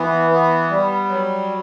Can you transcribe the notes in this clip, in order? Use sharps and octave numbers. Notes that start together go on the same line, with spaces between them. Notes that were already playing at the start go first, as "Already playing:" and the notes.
Already playing: E3 B3
B3
G3
F#3